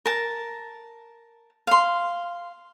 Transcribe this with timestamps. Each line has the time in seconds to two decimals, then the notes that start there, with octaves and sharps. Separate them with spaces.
0.06 A#4 A5
1.67 F5 C6